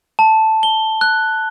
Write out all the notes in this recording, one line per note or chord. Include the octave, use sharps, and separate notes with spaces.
A5
G7
F#6